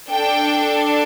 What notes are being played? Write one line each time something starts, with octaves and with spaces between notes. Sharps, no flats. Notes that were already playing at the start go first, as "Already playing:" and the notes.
D4 A4 G5